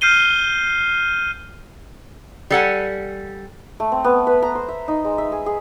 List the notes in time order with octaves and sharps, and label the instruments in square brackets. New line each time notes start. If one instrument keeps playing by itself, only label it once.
[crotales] F6 G6 C7 D#7 G7
[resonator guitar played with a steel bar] G3 A4 F#5 G#5
[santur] A3
C4
B3
B4
A#5
C5
E5
D#4
G#3
E5
G#4
G#4